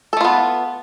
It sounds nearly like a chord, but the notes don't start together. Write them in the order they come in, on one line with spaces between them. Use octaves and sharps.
A4 A3 F4 B3